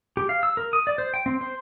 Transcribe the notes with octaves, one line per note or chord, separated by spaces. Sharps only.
G4
F5
E6
A#4
D#6
D5
C5
G5
C4
C5